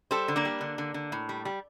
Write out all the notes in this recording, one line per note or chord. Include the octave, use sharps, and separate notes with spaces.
G3 A4 C5
D3
A#3 D4
G3
D3
D3
D3
A2
G3
G3